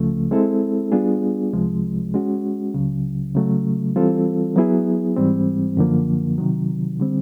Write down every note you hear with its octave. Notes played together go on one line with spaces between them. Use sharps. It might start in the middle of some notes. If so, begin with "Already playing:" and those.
Already playing: C#2 C#3 F3 A3
G#3 C4 E4 A4
G3 B3 D4 F4 G#4
C2 C3 F3 G#3
G#3 C#4 F#4
C#2 C#3 F#3
C#3 F#3 A3
E3 G3 C4 F4 A4
F#3 B3 E4 G#4
G#2 E3 G3 C4
F#2 D3 F3 A#3
C3 D#3 F#3
D3 G3 C4